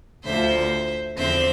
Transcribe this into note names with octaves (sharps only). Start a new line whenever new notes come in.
D2 D3 F3 C5 E5
E2 D3 F3 C4 C5 E5